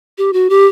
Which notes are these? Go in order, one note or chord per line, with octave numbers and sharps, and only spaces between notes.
G4
F#4
G4